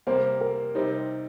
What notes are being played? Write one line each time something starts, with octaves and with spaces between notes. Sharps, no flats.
C3 G3 A#3 C5
A#4
C3 G3 C4 D#4